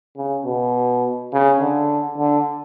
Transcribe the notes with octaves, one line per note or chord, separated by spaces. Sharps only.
C#3
B2
C#3
D3
D3